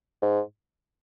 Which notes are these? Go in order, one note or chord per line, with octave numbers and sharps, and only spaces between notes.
G#2